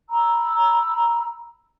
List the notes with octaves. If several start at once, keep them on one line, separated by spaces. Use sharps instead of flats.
A#5 B5 E6